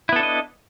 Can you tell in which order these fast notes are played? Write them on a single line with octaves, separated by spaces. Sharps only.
E4 B3 A4 D4 D#5